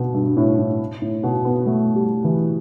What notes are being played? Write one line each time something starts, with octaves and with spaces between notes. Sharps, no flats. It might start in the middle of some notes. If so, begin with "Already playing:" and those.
Already playing: B2
G2
A2
A2
A2
B2
B3
A3
G3
E3